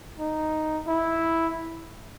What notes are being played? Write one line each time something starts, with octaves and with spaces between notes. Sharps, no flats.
D#4
E4